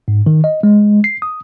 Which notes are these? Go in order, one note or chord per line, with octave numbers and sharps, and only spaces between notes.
G#2
D#3
D#5
G#3
C7
D#6